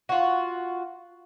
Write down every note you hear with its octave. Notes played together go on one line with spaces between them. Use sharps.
F4 F#4